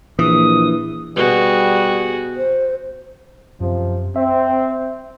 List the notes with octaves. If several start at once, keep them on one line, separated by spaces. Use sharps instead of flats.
A#1 E3 D#6
B2 G3 F#4 G#4
C5
F#2 C3 F3
C4 E5